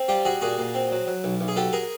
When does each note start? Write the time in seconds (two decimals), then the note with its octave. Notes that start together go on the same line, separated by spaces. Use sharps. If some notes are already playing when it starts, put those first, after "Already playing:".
Already playing: C4
0.08 G3 F4 G4
0.25 G3 F#4 G#4
0.41 A#2 F#4 G#4
0.58 A#2
0.74 C4
0.92 F#3
1.07 F#3
1.24 B1
1.41 B1
1.48 G#4
1.56 F#3 G4 A4
1.73 G#4 A#4